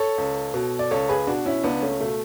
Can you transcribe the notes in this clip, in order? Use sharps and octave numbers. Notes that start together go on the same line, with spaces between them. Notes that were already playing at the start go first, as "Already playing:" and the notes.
Already playing: A4 C#5
C#2
B2
D5
C#2 A4 C#5
G#4 B4
B2 D4 F#4
C#4 E4
C#2 B3 D4
A3 C#4
B2 A3